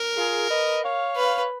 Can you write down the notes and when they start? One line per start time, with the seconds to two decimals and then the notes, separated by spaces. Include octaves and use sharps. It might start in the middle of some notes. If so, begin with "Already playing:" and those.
Already playing: A#4
0.16 F4 G#4
0.49 B4 D#5
0.83 C#5 F5
1.16 B4